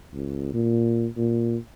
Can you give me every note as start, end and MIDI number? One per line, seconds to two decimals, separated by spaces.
0.14 0.52 37
0.54 1.07 46
1.17 1.57 46